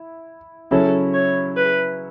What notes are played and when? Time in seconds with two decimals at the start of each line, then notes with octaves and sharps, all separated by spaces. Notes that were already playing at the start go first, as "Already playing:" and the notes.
Already playing: E4
0.71 C#3 F#3 C#4 E4 A4
1.14 C#5
1.57 B4